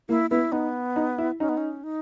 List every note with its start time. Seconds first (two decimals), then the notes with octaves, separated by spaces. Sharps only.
0.09 A#3 E4
0.30 B3 E4
0.52 B3 D#4
0.96 D#4
1.18 E4
1.40 C#4 D#4
1.49 B3
1.57 C#4
1.84 D#4